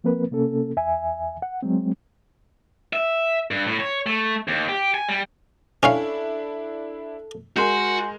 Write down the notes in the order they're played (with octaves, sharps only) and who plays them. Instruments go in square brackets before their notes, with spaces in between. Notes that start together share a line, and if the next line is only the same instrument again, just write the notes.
[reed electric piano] F3 A#3 C4 A#4 B4
C3 A#3 C#4 A4
E2 E5 G#5
F#5
F#3 G#3 C4
[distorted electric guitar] E5
G2
A2
C#5
A3
D#2
G4
G#5
G3
[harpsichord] C#4 C#5 F5 [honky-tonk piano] D4 E4 [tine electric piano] A4
[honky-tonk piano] G#3 A#4 [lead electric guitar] F#4 [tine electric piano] G#5 C6 G6